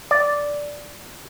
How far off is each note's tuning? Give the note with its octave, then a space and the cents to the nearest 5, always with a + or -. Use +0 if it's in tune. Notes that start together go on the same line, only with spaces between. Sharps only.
D5 -5